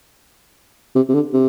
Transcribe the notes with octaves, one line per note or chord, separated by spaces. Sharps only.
C3
C3
D3
C3